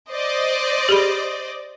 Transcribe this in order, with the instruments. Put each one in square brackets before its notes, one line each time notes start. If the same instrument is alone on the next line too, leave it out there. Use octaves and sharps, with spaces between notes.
[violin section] C5 D5 D#5
[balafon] G4 G#4 B5